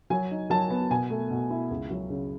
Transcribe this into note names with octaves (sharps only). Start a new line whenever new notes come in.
F#3 G#5
D#4
F#3 A5
B3
B2 G#5
A3
B2
E4
C#2
F#3
C#3